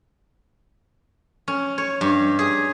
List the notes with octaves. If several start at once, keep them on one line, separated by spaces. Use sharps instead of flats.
C#4
C#5
G2
G#4